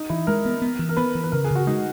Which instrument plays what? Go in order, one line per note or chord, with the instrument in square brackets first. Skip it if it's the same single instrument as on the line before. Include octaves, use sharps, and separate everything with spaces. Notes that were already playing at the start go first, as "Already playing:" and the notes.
Already playing: [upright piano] D#4
[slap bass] E3 [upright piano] E4
[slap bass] G#3 [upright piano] A#4
[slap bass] B3
B3
E3
[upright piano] A#4
[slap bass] B3 [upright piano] B4
[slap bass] E3
[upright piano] B4
[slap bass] C#3 [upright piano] A#4
[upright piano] G#4
[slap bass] C#3
[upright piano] F#4
[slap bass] G#3 [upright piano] D#4